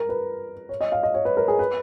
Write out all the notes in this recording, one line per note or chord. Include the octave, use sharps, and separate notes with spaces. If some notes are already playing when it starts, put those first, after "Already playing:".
Already playing: A#4
B4
C#5
D#5
F5
D#5
C#5
B4
A#4
G#4
B4